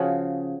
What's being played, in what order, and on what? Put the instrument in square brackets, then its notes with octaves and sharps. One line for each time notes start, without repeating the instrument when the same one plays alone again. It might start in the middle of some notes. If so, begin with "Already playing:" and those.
Already playing: [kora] C#3 F3 F#4 G#4